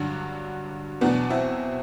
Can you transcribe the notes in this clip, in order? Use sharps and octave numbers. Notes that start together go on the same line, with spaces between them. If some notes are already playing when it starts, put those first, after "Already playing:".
Already playing: G2 D3 F#3 D4 F#4
E2 B2 F#3 B3 D4
C4 E4